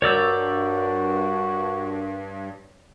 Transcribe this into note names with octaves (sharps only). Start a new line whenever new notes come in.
G2 F#4 A#4 C#5 D5 E6 G6